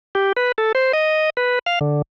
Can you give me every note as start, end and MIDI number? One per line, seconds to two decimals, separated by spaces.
0.15 0.32 67
0.37 0.52 71
0.58 0.72 69
0.75 0.92 72
0.93 1.30 75
1.37 1.59 71
1.66 1.79 77
1.81 2.02 50